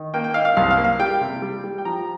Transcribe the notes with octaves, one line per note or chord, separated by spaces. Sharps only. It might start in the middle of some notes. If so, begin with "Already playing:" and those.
Already playing: D#3
A#3 G5
G5
D#4 F5
F5
C2 F5
F5
A#3
F5
G3 G5
C3
G3
G3
G5
F3 A#5